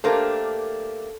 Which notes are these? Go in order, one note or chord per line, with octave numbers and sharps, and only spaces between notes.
A3 A#3 D4 G4 A4 A#4 C5